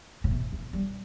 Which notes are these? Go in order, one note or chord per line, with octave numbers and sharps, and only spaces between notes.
C#3
C3
E3
G3